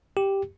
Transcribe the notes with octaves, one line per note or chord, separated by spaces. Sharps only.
G4